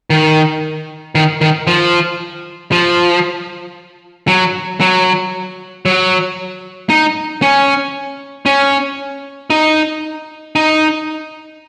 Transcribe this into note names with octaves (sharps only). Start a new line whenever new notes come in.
D#3
D#3
D#3
F3
F3
F#3
F#3
F#3
D#4
C#4
C#4
D#4
D#4